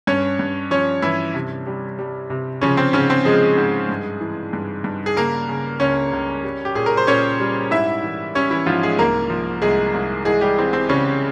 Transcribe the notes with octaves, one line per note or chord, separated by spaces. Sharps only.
G2 C#4 C#5
G2
F3 C#4 C#5
G2 E3 E4
C3
G3
G3
C3
C#3 F3 C#4
C4
G#2 C#3 C#4
C4
F3 G#3 G#4
G#2
G2
E3
G2
G2
G#4
C#3 A#3 A#4
C#3
C#2 C#4 C#5
C#2
G3
G4
A#2 G#4
A#4
C5
A#2 C#4 C#5
G3
G#2 E4 E5
E3
G3 C#4 C#5
E3 E4
G#2 F3 F4
G#3 G#4
C2 A#3 A#4
F3
C2 G#3 G#4
C2
E3 G#3 G#4
G3 G4
E3 C4
C4
C#3 G3 C#4